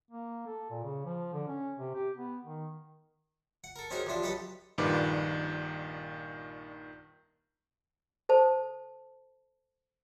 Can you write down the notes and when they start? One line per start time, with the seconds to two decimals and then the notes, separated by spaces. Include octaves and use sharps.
0.11 A#3
0.46 A4
0.70 A#2
0.83 C#3
1.05 F3
1.33 D3
1.48 C#4
1.78 C3
1.95 G4
2.17 B3
2.45 D#3
3.64 F#5
3.76 A4 A#4
3.91 C4 C#4 D#4 F#4 G#4 A#4
4.06 A1 C3 F3 D4 C5
4.22 B1 G4 A4 B4 D#5 G5
4.78 A#1 G2 A#2 D#3 B4 D6
8.29 A4 C5 A5